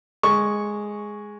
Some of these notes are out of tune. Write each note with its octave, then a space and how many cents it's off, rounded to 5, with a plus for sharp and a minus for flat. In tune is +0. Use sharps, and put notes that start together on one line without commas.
G#3 +0 C#6 +0